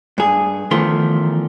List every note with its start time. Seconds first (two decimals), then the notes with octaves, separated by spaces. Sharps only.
0.18 G2 G#4
0.71 E2 D#3 F3 A3 C6